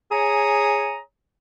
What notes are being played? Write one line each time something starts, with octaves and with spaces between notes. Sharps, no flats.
G#4 C#5 G#5 A#5 D#6